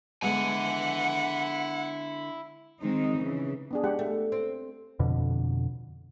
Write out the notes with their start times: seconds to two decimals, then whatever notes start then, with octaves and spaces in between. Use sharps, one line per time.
0.22 D3 G#3 B3 E4 F#5 G#5
2.81 D#3 G#3 C4 D#4
3.18 C#3 E3
3.71 B3 D4 G#4
3.84 G#3 G4 F#5
3.99 A3
4.32 C4
4.99 F2 B2 D3